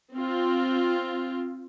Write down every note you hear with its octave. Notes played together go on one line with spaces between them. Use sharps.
C4 F4